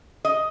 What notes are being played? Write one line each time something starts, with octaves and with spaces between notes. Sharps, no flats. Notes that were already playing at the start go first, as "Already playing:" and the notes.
D#5